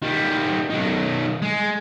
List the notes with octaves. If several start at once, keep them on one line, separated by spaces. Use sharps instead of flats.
D#3 G3
B1 D#3
G#3